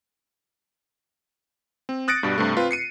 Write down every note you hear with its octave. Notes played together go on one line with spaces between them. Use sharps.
C4
D#6 F#6 A6 A#6 C#7 D7
G2 B2 G3
G2 C3 A3
C4 F4 B4
C7 C#7 D#7